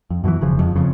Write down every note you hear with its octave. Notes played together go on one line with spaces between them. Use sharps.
F2
F#2 B2 D#3 E3
E1 C#3 F3
F2
F#1 F2 C#3